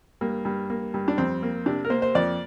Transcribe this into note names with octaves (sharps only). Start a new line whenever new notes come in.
G2 A#3
G2
A#3
G2
D4
F2 C4
A#3
C3 D4
A#4
A#3 C5
C5
F2 D5